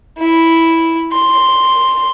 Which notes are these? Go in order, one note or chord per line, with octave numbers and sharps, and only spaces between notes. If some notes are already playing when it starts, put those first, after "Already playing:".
E4
C6